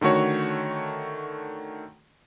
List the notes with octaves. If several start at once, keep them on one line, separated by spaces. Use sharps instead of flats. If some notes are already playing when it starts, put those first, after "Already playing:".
D3 D#3 A3 F#4 C#5